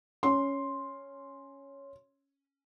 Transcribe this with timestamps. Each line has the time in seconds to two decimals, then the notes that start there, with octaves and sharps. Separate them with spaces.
0.23 C#4 C6